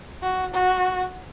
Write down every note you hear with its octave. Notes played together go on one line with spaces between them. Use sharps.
F#4
F#4